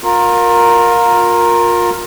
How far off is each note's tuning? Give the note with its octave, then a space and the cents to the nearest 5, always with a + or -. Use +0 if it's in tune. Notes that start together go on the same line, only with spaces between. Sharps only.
F4 +30 A#4 +0